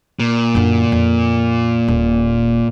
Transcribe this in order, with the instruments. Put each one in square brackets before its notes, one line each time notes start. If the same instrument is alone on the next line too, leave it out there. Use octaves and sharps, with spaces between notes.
[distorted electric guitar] A#2
[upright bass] F#2 D3
F2
D#1